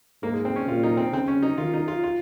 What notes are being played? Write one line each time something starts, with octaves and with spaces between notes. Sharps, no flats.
G#2 A#3
G#3
C4
C#4
A#2 F4
D#4
C4
C#3 C4
C#4
D#4
D#3 F4
D#4
F4
F4